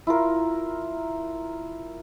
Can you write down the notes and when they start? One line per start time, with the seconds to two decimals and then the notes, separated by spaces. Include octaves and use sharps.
0.07 E4 F4 A#4